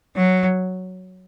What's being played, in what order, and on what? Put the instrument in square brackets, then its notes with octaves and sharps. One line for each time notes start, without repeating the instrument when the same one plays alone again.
[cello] F#3